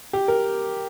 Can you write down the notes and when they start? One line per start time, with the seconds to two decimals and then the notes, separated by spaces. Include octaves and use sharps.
0.13 G4
0.28 A#4